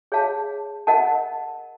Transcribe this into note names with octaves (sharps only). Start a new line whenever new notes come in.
G#4 C#5 F5 A5
A#4 D#5 F#5 A5